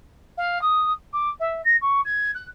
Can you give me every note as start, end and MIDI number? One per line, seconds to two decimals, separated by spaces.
0.37 0.61 77
0.61 0.92 87
1.12 1.29 86
1.39 1.61 76
1.64 1.76 94
1.81 2.00 85
2.04 2.31 92
2.34 2.46 90